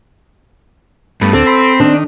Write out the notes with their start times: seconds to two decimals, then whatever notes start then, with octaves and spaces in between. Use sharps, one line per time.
1.21 G2 A3 B3
1.33 D2 C4 A4
1.47 B5 C6
1.80 D#3 D4